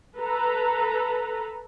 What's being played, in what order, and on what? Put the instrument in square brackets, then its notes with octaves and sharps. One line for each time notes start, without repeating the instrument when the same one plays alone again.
[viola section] A4 B4 A#5